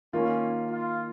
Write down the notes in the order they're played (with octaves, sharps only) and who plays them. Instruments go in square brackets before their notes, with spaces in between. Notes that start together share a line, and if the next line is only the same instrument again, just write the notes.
[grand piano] D#3 A#3 F4 [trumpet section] C#4
[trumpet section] F4